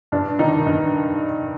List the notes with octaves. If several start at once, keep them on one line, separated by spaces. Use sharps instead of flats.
G2 D4
D#3 D#4
G2